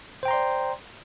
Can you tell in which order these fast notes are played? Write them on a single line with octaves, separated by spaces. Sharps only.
C5 G5 A#5 C6 D5